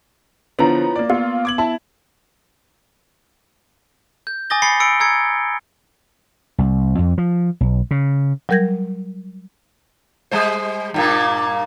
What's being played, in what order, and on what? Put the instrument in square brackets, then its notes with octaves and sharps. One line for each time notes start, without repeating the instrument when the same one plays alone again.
[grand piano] D3 F3 [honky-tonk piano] B3 A#5 [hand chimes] E4 F4 C#5
[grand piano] A#3 D5
[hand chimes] B3 [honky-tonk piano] F4
[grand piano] D6 G#6 F#7
[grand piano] E4 [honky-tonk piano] A5
[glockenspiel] G6
G#5 D6 D#6 A6 A#6 G7
G#5 B5 A6 C7 C#7 G7
B5 E6 C#7 D7
A#5 E6 G#6 C#7
[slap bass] C2
F2
F3
B1
C#3
[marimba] F#3 G3 A#4 G6 G#6 A#6
[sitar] G3 G#3 C5
G2 A#2 A#3